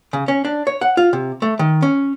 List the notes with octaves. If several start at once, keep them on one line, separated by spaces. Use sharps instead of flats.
C#3
C#4
D4
C#5
F#5
F4
C3
A3
D#3
C#4